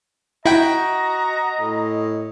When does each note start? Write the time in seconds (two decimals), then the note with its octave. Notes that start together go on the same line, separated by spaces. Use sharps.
0.46 E4 F#4 D#5 G5 A#5
1.60 A2